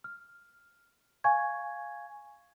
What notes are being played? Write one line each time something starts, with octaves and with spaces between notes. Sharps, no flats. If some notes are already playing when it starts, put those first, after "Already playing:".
F6
F5 G#5 C#6 G#6